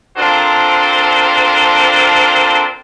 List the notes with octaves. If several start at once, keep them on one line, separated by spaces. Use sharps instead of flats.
C4 D4 F4 A4 A#4 C5